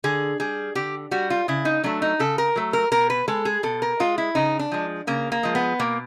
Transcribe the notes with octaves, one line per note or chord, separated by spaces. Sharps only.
D3 G#4
G3 G#4
D3 G4
G3 F#4
F4
C#3 E4
D#4
F#3 A3 D4
D#4
C#3 A4
A#4
F#3 A3
A#4
B2 A#4
B4
G#3 A4
G#4
B2 A4
A#4
G#3 F4
E4
C#3 D#4
D4
F3 G#3
C#3 A#3
A#3
F3 G#3
B3
B2 A#3